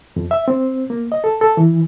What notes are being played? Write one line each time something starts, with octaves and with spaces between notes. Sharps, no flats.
F2
E5
C4
A#3
D#5
A4
A4
E3